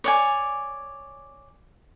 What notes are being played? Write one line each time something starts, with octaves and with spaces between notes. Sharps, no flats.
C#5 D5 G#5